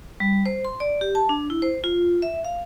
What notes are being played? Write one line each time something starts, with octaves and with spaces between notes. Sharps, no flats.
G3
C5
C6
D5
G4
A5
D4
E4
C5
F4
E5
F5